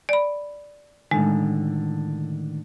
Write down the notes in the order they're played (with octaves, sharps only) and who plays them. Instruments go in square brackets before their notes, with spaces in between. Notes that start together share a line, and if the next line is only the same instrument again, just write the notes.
[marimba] D5 B5
[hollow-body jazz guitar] A2 D3 D#3 [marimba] G#3